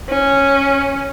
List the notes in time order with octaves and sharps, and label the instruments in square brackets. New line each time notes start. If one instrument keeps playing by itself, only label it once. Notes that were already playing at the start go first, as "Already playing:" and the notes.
[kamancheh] C#4